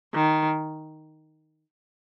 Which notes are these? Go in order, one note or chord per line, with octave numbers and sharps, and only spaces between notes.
D#3